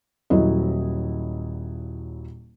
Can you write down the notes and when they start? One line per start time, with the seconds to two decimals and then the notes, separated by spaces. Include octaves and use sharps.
0.30 D#1 F#3 E4 D#5